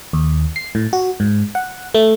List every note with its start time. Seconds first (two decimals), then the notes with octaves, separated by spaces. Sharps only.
0.13 D#2
0.56 C7
0.75 A2
0.93 F#4
1.20 G#2
1.55 F#5
1.94 A3